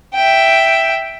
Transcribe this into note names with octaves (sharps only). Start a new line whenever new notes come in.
E5 G5